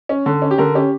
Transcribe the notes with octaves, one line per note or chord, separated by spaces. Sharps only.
C#4
D3
C#4
G4
D3 A#4
C#4 G4